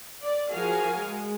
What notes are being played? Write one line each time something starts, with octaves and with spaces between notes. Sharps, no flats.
D5
F3 F#4 G#4 A#4 F5 G#5
G#3